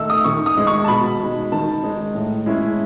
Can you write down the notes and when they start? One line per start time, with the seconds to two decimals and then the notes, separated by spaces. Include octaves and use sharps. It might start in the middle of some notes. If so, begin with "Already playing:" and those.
Already playing: D#3 A3 D#4 E6
0.10 D#6
0.24 D#3 C#6
0.46 D#6
0.57 G#3 D#4
0.67 C#6
0.84 A5
0.88 B2 B5
1.20 G#3 D#4
1.52 D#3 A5
1.84 G#3 D#4
2.15 A2
2.46 G#3 C#4 E4